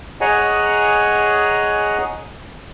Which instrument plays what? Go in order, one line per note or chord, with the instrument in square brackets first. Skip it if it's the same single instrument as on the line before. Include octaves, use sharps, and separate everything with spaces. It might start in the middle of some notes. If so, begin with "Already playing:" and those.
[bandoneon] G#4 C#5 D#5 F#5 G#5 A#5